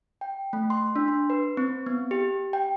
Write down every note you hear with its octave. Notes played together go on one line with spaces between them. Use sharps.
G5
A3
C6
D4
C6
B4
C4
B3
G4
G5